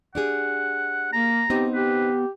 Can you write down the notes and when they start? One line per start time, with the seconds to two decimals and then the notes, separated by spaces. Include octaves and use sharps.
0.15 D4 G4 G#4 F#5
1.13 A#3 A#5
1.50 B3 C4 D#4 G4
1.74 G4 B4